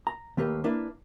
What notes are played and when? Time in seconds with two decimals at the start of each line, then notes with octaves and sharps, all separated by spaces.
0.07 A#5
0.37 D#2 A3 A#3 G4 B4
0.64 A#3 D4 E4 B4